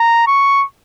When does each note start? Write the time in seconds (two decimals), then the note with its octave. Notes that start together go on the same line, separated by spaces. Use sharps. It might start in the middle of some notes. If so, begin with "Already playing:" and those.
Already playing: A#5
0.27 C#6